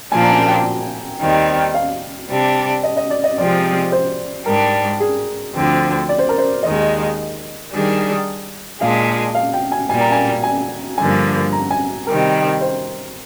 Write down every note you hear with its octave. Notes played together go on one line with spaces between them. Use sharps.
A#2 F3 A#3 D4 G#5
A#5
G#5
G5
D#2 D#3 G3 C4
F5
C3 G3 D4
D#5
D#5
D5
D#5
C3 F3 G#3 C4 D5
C5
G#2 G3 D4 A#4
G#4
D2 D3 F3 C4
D5
C5
A#4
C5
D#2 D#3 G#3 D#5
D#3 G3 D4 G#4
A#2 G#3 D4 F5
F5
G5
G#5
A#2 G3 A#3 G#5
A#5
G#5
G#5
G2 D3 F3 A#3 G#5
A#5
G#5
C3 D#3 G3 A#4
C5